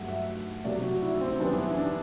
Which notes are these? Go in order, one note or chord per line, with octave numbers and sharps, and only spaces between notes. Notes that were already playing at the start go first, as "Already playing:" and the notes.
Already playing: G2 F#3 A3 F#5
E5
C3 F#3 A3 D5
F#4
E4
C4
F#2 E3 G3 B3 D4
E4
E4
D4